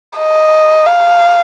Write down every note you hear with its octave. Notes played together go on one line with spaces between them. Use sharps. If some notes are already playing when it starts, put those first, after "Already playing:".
D#5
F5